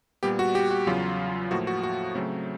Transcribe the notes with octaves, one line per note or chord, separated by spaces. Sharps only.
A#2 G3 B3 G4
F#4
G4
F#4
E2 C#3 F#3 F4
A2 F3 A#3 F#4
F#4
F#4
C#3 F#3 A3 C4